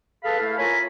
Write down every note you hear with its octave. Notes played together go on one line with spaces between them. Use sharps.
G#4 A4 B4 F5 A5 B5
A3 E4 A4 F5
F4 A#4 C#5 G#5 A#5 B5